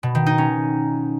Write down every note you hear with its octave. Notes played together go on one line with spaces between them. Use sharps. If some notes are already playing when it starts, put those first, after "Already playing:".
B2
D#3
D#4
C#4